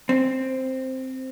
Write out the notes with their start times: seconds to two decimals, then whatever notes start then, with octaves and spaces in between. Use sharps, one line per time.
0.09 C4